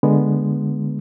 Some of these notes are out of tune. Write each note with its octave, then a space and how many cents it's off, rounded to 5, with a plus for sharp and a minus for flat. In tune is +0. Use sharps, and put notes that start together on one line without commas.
D3 +0 G#3 +0 B3 -10